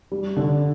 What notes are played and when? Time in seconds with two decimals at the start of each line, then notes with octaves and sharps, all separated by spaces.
0.12 G3
0.36 D3